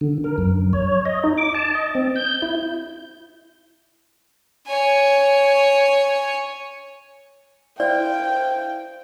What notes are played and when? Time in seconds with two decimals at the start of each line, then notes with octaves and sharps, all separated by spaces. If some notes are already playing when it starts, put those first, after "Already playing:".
0.01 D3
0.24 A#4
0.38 F#2
0.73 C#5
1.05 D#5
1.24 D#4
1.38 D6
1.54 A5
1.75 D#5
1.95 C4
2.16 G6
2.42 E4
4.67 C#5 G#5
7.80 E4 C5 D5 F5 G5